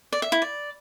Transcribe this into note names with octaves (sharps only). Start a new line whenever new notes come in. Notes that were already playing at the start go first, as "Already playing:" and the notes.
D5
E5
E4
D5